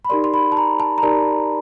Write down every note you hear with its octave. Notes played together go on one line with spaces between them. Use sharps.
B5
D#4 G4 A#4 D5 C6
C6
B5
A5
A#5
A5
A#5
D#4 G4 A#4 D5 A5